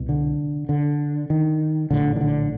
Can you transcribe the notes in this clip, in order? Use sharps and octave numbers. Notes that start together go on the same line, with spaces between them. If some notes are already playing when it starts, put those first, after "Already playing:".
Already playing: C2 B2
D3
D3
D#3
A#1 A2 D3
D#3
D3